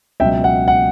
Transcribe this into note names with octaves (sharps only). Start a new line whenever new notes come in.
C#2 B2 F#3 E5 G5
F#5
F#5